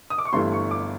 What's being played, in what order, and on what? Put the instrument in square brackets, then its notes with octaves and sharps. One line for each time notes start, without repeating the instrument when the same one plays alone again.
[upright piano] D#6
D6
C#6
G1 G2 E3 A3 C6
C#6
D6